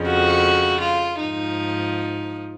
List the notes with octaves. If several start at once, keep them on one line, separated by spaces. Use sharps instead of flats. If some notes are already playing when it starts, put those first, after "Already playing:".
Already playing: F2 C#3 F3
F#4
F4
G#2 F3 D#4